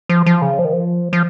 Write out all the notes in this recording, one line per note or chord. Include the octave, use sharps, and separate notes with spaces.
F3
F3
C#3
F3
D#3
F3
F3